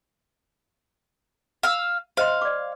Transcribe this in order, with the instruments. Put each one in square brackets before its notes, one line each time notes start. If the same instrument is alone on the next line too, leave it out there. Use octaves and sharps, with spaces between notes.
[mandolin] F5 E6
[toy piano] C5 D#5 C6 [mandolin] F5
[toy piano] D5 D6